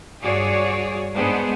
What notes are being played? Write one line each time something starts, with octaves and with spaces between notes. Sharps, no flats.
G2 F#4 G#4 C#5 D5
G#2 G#3 B3 D4 G#4 C5